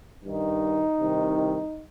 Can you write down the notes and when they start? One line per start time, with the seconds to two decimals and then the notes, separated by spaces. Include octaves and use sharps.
0.23 G2 D#3 D#4
0.99 C2 C3 D#3